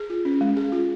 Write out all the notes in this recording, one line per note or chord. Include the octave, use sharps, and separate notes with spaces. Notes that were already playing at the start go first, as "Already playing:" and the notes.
Already playing: G#4
F4
C#4
G#3
G#4
F4